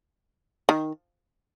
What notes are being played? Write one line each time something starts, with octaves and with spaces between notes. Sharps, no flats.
D#3